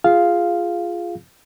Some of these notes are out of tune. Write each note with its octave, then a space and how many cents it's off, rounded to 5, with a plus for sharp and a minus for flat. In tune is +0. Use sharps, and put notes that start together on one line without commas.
F4 -10 G#4 -5 F5 +0